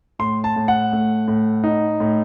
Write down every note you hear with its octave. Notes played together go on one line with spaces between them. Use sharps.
A2 C6
A5
A2
F#5
A3
A2
D#4
A2